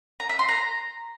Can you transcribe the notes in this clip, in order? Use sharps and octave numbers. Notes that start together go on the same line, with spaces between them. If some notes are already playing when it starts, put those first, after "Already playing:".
A#5
E5
C6
A#5